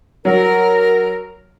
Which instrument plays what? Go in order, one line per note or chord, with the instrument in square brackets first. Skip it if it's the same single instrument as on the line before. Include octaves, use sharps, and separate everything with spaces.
[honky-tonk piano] F#3 [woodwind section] A#4